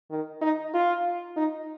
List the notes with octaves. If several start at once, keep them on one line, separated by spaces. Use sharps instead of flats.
D#3
D#4
F4
D#4